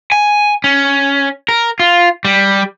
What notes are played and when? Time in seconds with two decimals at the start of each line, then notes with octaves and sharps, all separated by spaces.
0.12 G#5
0.64 C#4
1.49 A#4
1.80 F4
2.25 G3